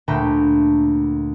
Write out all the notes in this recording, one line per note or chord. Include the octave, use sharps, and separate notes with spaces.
D2 A#2 A3 G5 A#5 B5